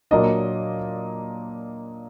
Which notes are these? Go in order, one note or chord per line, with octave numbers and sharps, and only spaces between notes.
A#2 F#3 A#3 D4 D#5